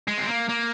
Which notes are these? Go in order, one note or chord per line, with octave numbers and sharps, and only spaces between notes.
G#3
C4
A#3
A#3